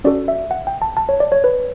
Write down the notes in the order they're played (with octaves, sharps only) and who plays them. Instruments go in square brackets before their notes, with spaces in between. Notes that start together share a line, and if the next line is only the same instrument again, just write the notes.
[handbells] C#4 F#4 A4 D5
E5
F#5
G5
A5
A5
C#5
D5
C#5
B4